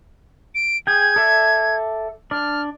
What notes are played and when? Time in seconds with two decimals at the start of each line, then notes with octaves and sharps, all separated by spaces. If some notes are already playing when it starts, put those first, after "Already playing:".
0.55 D7
0.87 G#4 G5 G#6
1.16 A4 D5 E5
2.31 D4 D5 F6